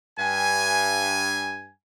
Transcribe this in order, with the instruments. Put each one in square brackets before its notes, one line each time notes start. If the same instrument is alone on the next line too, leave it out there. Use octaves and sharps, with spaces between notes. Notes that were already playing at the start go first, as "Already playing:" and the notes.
[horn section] G2 G#5